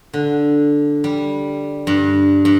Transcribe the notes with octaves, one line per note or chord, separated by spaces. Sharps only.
D3
G3
G2
G2